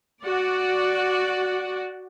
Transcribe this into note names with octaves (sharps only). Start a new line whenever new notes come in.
F#4 D5